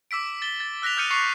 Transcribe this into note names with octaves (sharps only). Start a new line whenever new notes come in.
D6 E6 B6 D7
A6 G7
A6
E6 F#6 A#6 B6 F7
D#6 F6 G6 A6 C#7 D#7
C#6 A6 C7 C#7 F7